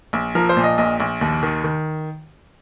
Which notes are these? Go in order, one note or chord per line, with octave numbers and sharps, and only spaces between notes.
A#1
F3 A#4
C5
A#2
D#5
A#1 D#5
A#1
D#2
D#3
D#3